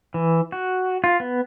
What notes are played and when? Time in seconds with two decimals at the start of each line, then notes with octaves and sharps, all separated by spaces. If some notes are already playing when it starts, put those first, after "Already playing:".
0.14 E3
0.52 F#4
1.04 F4
1.20 B3